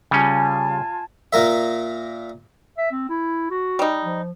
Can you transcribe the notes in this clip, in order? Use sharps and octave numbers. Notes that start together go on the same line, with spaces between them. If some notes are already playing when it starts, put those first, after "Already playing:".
C#3 G3 C#4 F4 G#5 A5
A#2 A#3 A#4 E5
E5
C4
E4
F#4
G3 D#4
F3